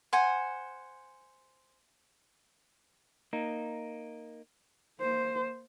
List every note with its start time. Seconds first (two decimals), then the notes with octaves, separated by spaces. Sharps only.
0.13 C5 F#5 G#5
3.33 A#3 D#4
4.99 A#3 C5